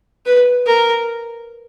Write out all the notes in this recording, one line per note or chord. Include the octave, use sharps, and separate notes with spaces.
B4
A#4